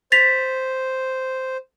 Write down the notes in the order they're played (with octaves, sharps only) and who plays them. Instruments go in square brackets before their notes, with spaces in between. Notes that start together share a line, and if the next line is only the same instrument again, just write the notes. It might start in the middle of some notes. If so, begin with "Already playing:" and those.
[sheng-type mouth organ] C5 [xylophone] A6 B6 F7